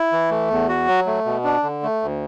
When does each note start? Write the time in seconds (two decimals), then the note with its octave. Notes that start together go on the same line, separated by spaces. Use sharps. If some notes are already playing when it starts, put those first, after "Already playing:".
Already playing: E4
0.12 E3
0.30 A3
0.50 E2
0.69 F#4
0.88 F#3
1.06 A3
1.25 B2
1.44 D4
1.63 D3
1.83 A3
2.02 D2